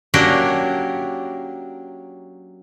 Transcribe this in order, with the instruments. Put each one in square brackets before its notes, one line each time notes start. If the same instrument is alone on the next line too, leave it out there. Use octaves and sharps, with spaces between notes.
[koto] F#3 A#3 C#4 D4 G4 A#4